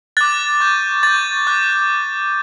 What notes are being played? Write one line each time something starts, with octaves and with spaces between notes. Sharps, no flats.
D6 F#6 A6
C#6 G6
C#6 G6 A6
D6 F#6